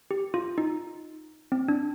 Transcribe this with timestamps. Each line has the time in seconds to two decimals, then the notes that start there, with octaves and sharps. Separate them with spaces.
0.11 G4
0.34 F4
0.58 D#4
1.52 C4
1.68 D4